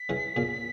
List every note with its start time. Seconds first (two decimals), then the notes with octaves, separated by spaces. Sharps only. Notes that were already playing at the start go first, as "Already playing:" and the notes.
Already playing: B6
0.09 C#3 E3
0.36 A#2 C#3